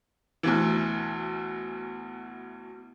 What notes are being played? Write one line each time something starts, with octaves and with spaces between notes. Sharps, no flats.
D2 B2 E3